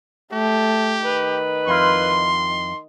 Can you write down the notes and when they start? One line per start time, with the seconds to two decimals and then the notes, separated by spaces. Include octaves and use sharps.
0.33 A3 G4
1.05 D#3 B4
1.67 F2 E4 F4 C6